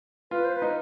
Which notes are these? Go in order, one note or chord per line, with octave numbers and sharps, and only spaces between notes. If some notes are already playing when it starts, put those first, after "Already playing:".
F4 B4
C5
B4
D#4